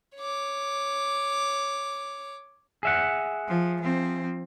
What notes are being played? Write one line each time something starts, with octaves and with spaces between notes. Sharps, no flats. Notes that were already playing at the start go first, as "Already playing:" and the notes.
C#5 D6
G#4 E5 F#5
F3
F3 C4